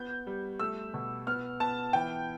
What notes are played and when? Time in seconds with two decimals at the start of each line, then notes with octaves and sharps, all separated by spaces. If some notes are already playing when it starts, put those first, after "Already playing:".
Already playing: B3 G6
0.27 G3
0.60 A3 E6
0.94 B2
1.27 B3 F6
1.60 B3 A5
1.93 E3 G5